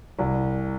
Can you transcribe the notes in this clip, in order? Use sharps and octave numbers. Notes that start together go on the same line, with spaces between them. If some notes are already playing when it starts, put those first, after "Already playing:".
C2